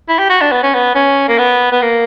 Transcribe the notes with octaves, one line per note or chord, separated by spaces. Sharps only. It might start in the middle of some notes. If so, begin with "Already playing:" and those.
E4
G4
F#4
D4
B3
C#4
B3
C#4
A#3
B3
B3
A#3